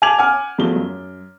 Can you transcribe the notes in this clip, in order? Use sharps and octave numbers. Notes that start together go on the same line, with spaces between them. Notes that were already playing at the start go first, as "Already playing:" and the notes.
G#5 A5 D6 G#6 F7 F#7
F#5 G#5 D6 F6
E2 F3 A3 F#4 G7
F#2